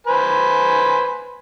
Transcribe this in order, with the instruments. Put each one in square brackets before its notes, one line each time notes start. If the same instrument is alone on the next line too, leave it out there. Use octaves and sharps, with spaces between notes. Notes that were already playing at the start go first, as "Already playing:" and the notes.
[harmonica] B4 C5 G#5